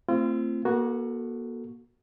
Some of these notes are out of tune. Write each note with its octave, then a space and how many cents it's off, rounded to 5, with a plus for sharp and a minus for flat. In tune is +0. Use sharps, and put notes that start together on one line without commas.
A3 +30 C4 +0 F4 -35
A#3 +40 F#4 +0 A4 +10